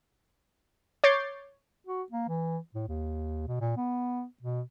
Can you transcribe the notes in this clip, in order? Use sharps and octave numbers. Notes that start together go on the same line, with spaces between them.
C#5 D6 G6 A6 C7
F#4
A#3
E3
A2
D#2
B2
A#2
B3
B2